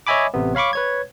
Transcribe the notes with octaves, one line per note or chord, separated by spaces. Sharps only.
C#5 D#5 E5 G#5 B5 D6
A1 C3 B3
C#5 F5 B5 C#6 D6
B4 C#5 G#6